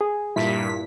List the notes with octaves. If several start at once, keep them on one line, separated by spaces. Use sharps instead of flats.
G#4
G2 A#2 E4 B6